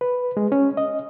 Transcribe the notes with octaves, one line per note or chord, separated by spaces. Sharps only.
B4
G#3
C#4
D#5